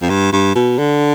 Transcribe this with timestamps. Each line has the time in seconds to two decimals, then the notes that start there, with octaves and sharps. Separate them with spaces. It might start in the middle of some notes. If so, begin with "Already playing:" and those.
0.02 F2
0.10 G2
0.32 G2
0.55 B2
0.79 D3